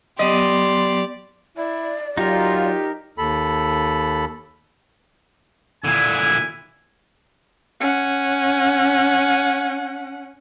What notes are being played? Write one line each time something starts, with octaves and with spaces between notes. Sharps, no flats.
F#3 B3 G4 D5 D#5 C6
E4 D5
F#3 D#4 F4 G4 A#4
D#2 A4 B5
A#2 D3 E4 G#5
C#4 F#5